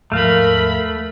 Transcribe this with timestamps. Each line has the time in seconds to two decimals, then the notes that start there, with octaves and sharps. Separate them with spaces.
0.12 D#2 G#2 F3 A3 A#4 F5 B5